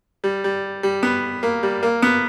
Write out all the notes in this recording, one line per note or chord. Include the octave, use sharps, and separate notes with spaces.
G3
G3
G3
B3
A#3
G3
A#3
B3